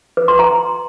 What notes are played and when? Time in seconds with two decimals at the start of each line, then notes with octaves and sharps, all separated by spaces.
0.17 B4
0.28 C6
0.39 A#5